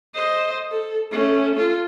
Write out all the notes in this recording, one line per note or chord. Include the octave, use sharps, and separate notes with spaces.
C5 D#5
A4
A3 C#4
F4 A4